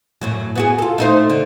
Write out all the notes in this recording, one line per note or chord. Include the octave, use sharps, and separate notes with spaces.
F#2 A2 F#3
B3 F#4 G#4
F4 A4
A3 D#4 C5
D3